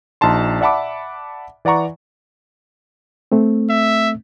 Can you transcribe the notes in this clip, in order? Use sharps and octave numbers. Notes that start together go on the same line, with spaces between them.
A#1 D#4 A5 C6
D5 E5 F#5 A5 B5 D6
E3 D5 F#5 A#5 C#6
A3 C4
E5